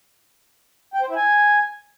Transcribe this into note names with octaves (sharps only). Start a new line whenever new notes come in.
G5
C5
E4
G#5